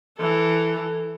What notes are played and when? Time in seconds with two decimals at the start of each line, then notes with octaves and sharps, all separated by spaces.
0.18 E3 A4